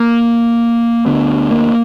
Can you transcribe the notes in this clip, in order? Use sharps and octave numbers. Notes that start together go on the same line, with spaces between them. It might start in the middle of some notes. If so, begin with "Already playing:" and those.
Already playing: A#3
D2 D3 B3
A#3